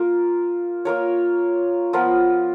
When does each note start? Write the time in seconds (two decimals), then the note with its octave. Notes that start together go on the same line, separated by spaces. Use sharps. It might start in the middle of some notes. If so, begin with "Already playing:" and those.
Already playing: A#3 F4 A#4
0.85 A#3 F4 A#4 C#5
1.93 F3 B3 F4 A#4